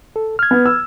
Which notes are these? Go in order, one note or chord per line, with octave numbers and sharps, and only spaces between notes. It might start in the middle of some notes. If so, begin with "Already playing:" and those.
A4
F6 G#6
B3
E6